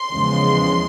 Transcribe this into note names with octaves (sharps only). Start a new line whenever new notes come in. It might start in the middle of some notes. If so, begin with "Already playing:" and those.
Already playing: C6
E2 C#3 F3 G#3